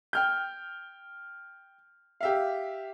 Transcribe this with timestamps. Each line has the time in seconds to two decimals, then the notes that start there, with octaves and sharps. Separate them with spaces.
0.13 G5 F6 G6
2.21 G4 E5 F5